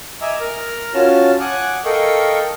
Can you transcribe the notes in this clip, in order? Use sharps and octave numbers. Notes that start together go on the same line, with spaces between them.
D#5 E5 G#5 A#5 D6 E6
A#4 A#5 F6
C#4 F4 F#4 C#5 A5 F6
F#5 G#5 D6 D#6 F#6
A4 A#4 D#5 F5 G5 C#6